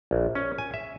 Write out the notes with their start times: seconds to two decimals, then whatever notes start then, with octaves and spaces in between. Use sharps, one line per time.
0.11 A#1
0.35 C#4
0.58 G#5
0.74 E5